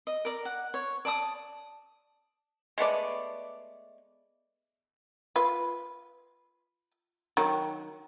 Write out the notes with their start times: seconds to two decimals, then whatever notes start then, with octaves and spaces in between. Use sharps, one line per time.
0.07 D#5
0.25 A#4 D5
0.45 F#5
0.74 C#5
1.05 D5 A5 A#5 D#6
2.78 G#3 A3 B3 D5
5.36 F4 B4
7.37 D#3 F#3